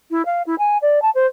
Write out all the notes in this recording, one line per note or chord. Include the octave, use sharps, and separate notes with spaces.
E4
F5
E4
G#5
D5
A5
C5